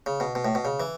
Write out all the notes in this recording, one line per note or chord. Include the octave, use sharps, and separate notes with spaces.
C#3
B2
B2
A2
B2
C#3
E3